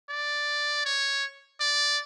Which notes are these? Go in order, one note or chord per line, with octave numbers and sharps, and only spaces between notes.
D5
C#5
D5